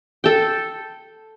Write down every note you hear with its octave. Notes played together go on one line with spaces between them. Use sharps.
A4 G5